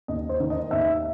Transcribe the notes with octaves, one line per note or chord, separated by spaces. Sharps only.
D#2 D#5
C5
D#3
D#5
D#2 E5